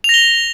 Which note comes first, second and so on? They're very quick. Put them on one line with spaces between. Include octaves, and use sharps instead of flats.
F7 A#6 G7